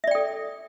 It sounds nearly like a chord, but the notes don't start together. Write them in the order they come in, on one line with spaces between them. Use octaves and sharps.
E5 D5 G5 A4